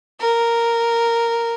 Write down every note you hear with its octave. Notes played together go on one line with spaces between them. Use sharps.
A#4